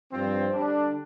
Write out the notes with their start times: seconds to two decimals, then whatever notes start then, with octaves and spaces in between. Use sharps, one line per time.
0.12 G2 F3 C4
0.54 D3 G3 D4